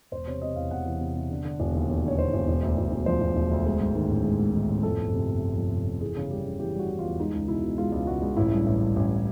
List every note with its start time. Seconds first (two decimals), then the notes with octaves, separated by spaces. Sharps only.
0.12 E1 C5
0.27 C3 C#5
0.42 C3 D#5
0.56 E2 F5
0.71 E1 F#5
0.86 E3
1.01 C3
1.15 C3
1.31 D3
1.45 D3
1.60 E1
1.75 D#2
1.89 D#2
2.04 D3 C#5
2.18 E1 C5
2.33 E1
2.48 E1
2.63 D2
2.78 E1
2.92 E1
3.06 F3 C5
3.21 E1
3.36 E1
3.51 D2
3.66 G#3
3.81 G#2
3.95 D#3
4.09 A1
4.25 G#3
4.39 G#2
4.54 D#3
4.69 A1
4.83 F2 A4
4.98 G1
5.13 C3
5.28 G1
5.42 G1
5.58 F2
5.71 C3
5.87 G1
6.01 E3 G#4
6.17 C#3
6.31 G3 G4
6.45 C#3
6.60 E3 G4
6.74 G3 F#4
6.90 E3
6.99 E2 F4
7.20 G#3 D#4
7.34 C#2
7.48 B2 E4
7.63 B2
7.78 G#3 F4
7.92 C#2
8.07 C#2 F#4
8.22 C#2
8.36 A1 E4
8.52 G2
8.66 A1
8.81 G2
8.96 A1